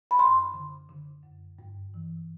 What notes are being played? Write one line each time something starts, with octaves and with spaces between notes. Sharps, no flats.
B5
F#2 C6
D3
D3
F#2
G2
E3